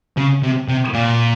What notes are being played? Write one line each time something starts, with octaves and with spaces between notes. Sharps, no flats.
C#3
C3
C3
A#2